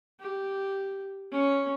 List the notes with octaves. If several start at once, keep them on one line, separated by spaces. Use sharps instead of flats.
G4
C#4